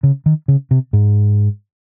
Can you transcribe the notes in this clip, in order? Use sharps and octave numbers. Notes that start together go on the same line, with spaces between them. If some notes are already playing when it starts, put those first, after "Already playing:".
C#3
D#3
C#3
C3
G#2